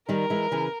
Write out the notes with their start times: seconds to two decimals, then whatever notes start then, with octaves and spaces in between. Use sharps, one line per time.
0.09 D#3 G3 A#4
0.30 E3 G#3
0.52 C#3 E3